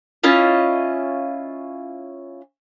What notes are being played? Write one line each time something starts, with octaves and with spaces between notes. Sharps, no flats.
C#4 E4 F4 D#5